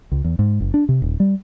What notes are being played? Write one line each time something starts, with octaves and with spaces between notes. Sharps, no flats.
C#2
E2
G#2
F#1
D4
C3
D#1
G3